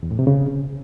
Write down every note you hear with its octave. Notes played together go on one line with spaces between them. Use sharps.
E2
A2
C3
C#3